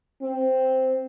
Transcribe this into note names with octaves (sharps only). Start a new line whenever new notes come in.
C4